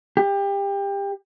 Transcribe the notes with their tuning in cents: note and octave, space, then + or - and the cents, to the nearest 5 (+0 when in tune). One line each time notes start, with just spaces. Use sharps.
G4 +25